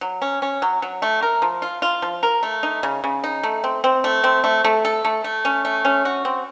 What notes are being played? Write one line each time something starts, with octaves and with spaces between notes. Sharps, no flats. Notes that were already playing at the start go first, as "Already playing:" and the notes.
F#3
C#4
C#4
F#3
F#3
A3
A#4
F3
F4
F4
F3
A#4
A3
D#4
C#3
C#3
D#4
A3
C4
C4
A3
C4
A3
A3
A4
A3
A3
C#4
A3
C#4
F#4
C4